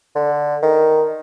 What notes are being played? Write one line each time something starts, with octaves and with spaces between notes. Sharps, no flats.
D3
D#3